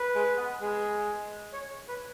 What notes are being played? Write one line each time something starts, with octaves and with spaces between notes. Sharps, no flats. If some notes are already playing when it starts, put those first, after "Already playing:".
Already playing: B4
G#3
B3
G#3
C#5
B4